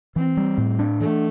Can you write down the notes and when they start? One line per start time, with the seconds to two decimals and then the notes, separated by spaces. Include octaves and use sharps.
0.16 E3 C4
0.37 G3
0.58 A2
0.79 D4
1.00 E3 A3